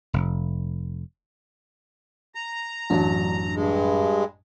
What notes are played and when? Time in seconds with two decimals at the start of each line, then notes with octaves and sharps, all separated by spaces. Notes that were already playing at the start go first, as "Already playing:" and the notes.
0.13 F1
2.35 A#5
2.90 A1 F#2 F#3 D4 A5
3.55 G2 G#3